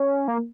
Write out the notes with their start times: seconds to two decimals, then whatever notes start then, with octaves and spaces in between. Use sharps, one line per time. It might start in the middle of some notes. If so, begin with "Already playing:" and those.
Already playing: C#4
0.28 A#3